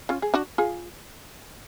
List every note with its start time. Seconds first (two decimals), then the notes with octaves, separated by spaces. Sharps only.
0.09 C#4 F4
0.22 G#4
0.34 D4 F#4
0.58 F4 G#4